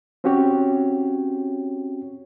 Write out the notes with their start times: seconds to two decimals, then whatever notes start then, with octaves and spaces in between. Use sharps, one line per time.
0.24 C4 C#4 F#4 G4 C#5